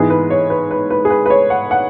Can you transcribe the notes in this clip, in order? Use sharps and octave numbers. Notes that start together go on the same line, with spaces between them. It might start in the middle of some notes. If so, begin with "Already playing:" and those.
Already playing: G#2 E3 G#3 B3 G#4
B4
C#5
B4
B4
B4
G#4
B4
B4
C#5
F#5
F#5